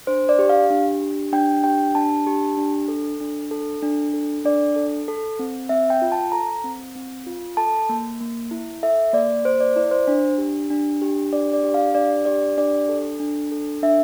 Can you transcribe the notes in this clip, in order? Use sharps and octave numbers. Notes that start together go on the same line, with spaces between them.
D4 C5
D5
G4
F5
D4
G4
D4 G5
G4 G5
D4 A5
G4
D4
A4
D4
A4
D4
A4
D4 D5
A4
A4
C4
C4 E5
G5
F4
A5
A4 A#5
C4
C4
F4
A4 A5
A#3
A#3
E4
A4 E5
A#3 D5
A#3 C5
D5
E4 D5
C5
D4
G4
D4
G4
D4 D5
D5
G4
F5
D4 D5
G4 D5
D4 D5
A4
D4
A4
D4 E5